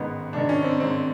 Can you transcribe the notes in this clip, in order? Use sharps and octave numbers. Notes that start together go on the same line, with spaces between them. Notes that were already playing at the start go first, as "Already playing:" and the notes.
Already playing: A1 G#2 D#3 B3
A1 G#2 D#3 D4
C#4
C4
A1 G#2 D#3 C4